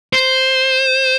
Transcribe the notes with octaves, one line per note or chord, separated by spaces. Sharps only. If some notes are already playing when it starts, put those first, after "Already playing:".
C5